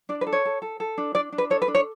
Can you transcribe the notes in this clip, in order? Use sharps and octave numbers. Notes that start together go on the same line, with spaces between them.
D4 D5
B4
A4
C#5
A4
A4
A4
D4
D4 D5
D4
B4
A4 C#5
B4
D4
C#5